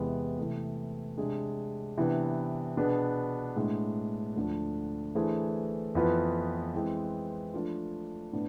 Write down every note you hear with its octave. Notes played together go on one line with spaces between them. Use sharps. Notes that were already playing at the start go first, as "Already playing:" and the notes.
Already playing: E2 C3 E3 G#3 B3
C3 E3 A3
C3 G#3 D4 G#4
C3 E3 B3 D4
B2 B3 D4 G#4 B4
A2 G#3 B3 D4
D2 D3 F3 A3 D4
E3 A3 D4 G#4 C5
F2 E3 B3 F4 B4
E3 G#3 C4
F3 A3 D4 F4
A2 B3 D4